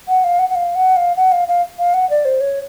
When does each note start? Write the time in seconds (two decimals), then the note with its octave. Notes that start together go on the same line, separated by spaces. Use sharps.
0.08 F#5
0.24 F5
0.39 F#5
0.50 F#5
0.55 F5
0.75 F#5
0.96 F5
1.16 F#5
1.32 F5
1.48 F5
1.79 F5
1.94 F#5
2.10 D5
2.25 C5
2.41 C#5